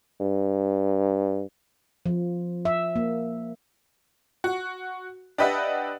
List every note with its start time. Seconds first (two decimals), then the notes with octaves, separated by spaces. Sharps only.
0.21 G2
2.06 F3
2.65 E5
2.96 A#3
4.44 F#4
5.38 D4 G4 B4 D#5 E5 F#5